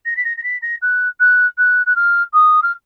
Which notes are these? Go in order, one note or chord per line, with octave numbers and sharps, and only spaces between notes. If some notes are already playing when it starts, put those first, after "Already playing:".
A#6
B6
A#6
A#6
B6
A#6
F#6
F#6
F#6
F#6
F6
D#6
F6